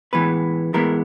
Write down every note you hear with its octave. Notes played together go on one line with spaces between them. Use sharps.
A2 E3 G#3 B3 B4
A2 E3 G#3 B3 A#4